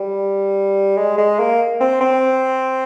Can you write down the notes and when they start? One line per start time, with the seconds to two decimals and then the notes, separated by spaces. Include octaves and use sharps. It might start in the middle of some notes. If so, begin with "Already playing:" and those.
Already playing: G3
0.97 G#3
1.18 G#3
1.39 A#3
1.80 C4
2.01 C4